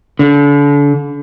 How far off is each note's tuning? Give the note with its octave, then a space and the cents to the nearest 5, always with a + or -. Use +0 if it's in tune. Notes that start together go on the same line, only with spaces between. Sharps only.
D3 -35